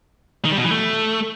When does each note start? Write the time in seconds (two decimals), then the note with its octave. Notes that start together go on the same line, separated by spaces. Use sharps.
0.45 D#3
0.51 G3
0.58 B2
0.64 E3
0.71 A3